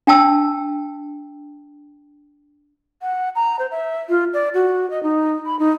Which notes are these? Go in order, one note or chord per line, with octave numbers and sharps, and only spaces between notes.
D4 G5 A5 E6
F#5
A#5
C5
E5
F4
D5
F#4
D#5
D#4
B5
D#4